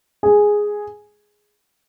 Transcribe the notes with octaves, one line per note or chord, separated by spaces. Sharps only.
G#4